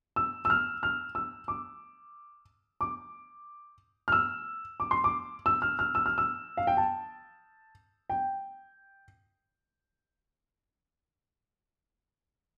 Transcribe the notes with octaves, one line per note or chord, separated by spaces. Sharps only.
E6
E6
F6
F6
E6
D6
D6
F6
E6
D6
C6
D6
E6
F6
F6
E6
F6
E6
F5
G5
A5
G5